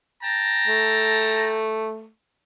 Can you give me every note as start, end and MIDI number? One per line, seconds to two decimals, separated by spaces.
0.22 1.57 79
0.22 1.57 81
0.22 1.57 82
0.67 2.08 57